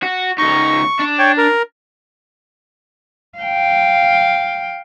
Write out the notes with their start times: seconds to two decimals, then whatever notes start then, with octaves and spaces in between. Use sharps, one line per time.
0.03 F#4
0.38 C#2 D#4 C#6
1.00 D4
1.19 C#5 G5
1.38 A#4
3.39 F5 G5